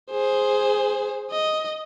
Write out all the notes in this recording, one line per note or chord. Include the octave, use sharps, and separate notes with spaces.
G#4 C5
D#5